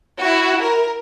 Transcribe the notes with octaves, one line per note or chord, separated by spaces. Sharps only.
E4 F#4
A#4